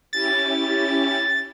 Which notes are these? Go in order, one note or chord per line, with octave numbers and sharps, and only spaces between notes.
C#4 E4 G4 A6